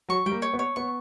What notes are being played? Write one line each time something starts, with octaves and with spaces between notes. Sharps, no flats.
F#3 C#6
G3 G5
A#3
C#5
B3
C#5
B3 C#6